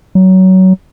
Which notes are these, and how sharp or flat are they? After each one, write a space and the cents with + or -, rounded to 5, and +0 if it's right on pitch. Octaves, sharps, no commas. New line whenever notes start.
F#3 +20